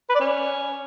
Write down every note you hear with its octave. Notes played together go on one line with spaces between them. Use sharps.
B4
D5
C#4